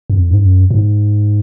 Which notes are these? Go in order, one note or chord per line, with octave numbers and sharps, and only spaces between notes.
F2
G#2
F#2
G#2